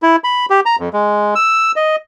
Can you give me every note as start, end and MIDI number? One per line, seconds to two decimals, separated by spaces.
0.02 0.16 64
0.24 0.46 83
0.50 0.60 67
0.66 0.76 82
0.79 0.89 41
0.93 1.34 56
1.35 1.72 88
1.76 1.96 75